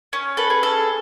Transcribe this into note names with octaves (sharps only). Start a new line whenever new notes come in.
C#4
A4 B4
G#4
A4